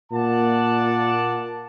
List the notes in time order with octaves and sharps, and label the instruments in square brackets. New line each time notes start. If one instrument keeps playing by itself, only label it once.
[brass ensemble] A#2 A#3 D5 F#5 A5